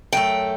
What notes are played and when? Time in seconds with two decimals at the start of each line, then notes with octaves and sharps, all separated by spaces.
0.13 F#2 F#3 A3 G5